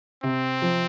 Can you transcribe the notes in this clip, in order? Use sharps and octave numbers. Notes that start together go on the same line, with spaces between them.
C3 C4
F3